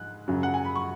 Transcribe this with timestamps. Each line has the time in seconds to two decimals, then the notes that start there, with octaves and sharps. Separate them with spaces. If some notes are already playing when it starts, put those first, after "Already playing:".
Already playing: G#2 F#6
0.28 F#2 C#3 F#3
0.43 F#5
0.54 G#5
0.65 B5
0.76 C#6